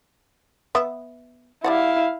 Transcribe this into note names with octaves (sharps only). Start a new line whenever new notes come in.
B3 E5
G3 E4 D5 F5 F#5